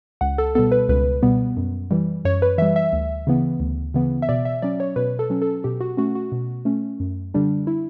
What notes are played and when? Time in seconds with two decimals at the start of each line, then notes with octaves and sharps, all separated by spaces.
0.21 C#2 F#5
0.38 A4
0.55 B2 G3 B3 A4
0.72 B4
0.89 C#2 B4
1.23 B2 G3 B3
1.57 F#2
1.91 E3 G3
2.25 F#2 C#5
2.42 B4
2.58 E3 E5
2.62 G3
2.76 E5
2.93 D2
3.27 C#3 E3 B3
3.60 D2
3.94 C#3 E3 B3
4.22 E5
4.29 B2 D5
4.45 E5
4.62 F#3 C#4 D5
4.80 C#5
4.96 B2 B4
5.19 A4
5.30 F#3 C#4
5.42 A4
5.64 B2 G4
5.81 F#4
5.97 A3 C#4 F#4
6.15 F#4
6.32 B2
6.65 A3 C#4
7.00 F#2
7.34 D3 G3 D4
7.67 E4